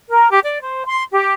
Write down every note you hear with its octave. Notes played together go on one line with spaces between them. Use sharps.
A#4
G4
D5
C5
C6
G4